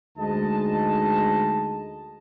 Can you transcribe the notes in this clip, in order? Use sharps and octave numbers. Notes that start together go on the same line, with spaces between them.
D2 G#3 D#4 D#5 A5